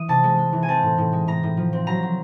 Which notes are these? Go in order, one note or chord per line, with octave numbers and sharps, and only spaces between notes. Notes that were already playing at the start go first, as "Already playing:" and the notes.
Already playing: E3 D#6
C3 A5
G#3
G#3
E3
G#5
C4 A5
A2
A2
G#3
A2 A#5
A2
F3
C4
F#3 A#5
F#3